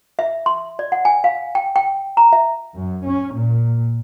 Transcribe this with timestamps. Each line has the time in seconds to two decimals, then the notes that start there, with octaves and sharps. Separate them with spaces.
0.19 E5
0.46 C6
0.79 D5
0.92 F#5
1.05 G#5
1.24 F5
1.55 G5
1.76 G5
2.17 A#5
2.33 E5
2.76 F#2
3.06 C#4
3.36 A#2